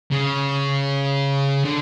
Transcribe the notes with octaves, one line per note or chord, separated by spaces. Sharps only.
C#3
D3